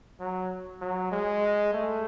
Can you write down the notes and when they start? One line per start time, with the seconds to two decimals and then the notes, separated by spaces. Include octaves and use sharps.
0.20 F#3
0.81 F#3
1.12 G#3
1.73 A3